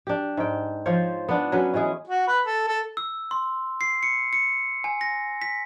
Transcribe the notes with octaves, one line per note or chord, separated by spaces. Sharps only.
D4 G4
G#2 G5
F3 F4 C5 C#5
B3 D4
F#3 C#4 B4
E3 G#3 C#4 G#4
F#4
B4
A4
A4
E6
C6
C7
C#7
C#7
G#5
A#6
B6